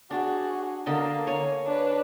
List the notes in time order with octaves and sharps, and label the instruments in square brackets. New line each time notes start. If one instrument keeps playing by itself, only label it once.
[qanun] D4 [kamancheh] F#4 G#4
[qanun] D3 D#5 A5 [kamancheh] A#3
[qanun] C#5 G#5
[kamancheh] D4 B4